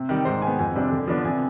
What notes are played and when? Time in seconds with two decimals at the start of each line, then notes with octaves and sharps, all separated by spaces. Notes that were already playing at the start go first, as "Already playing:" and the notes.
Already playing: C3
0.09 D#3 G3
0.25 G#2 C5
0.42 D#3 G#5
0.47 B3
0.59 F2 G#5
0.75 C3 G3 D4
0.91 D3
1.07 F3 B3 D4
1.25 C3 G#5